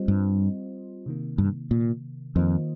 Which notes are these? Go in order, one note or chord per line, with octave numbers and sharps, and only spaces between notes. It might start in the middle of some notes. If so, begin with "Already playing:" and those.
Already playing: G3 C4 F4 C5 D#5
G2
C3 D#3 A#3
G2
A#2
F2 D#3 A#3 F4 C5 D#5